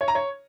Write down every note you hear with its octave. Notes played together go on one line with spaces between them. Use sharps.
C#5
A#5
C#5